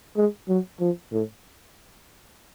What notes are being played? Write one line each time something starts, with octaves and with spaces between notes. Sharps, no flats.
G#3
F#3
F3
A2